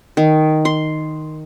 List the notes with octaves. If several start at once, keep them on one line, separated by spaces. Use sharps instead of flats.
D#3
C6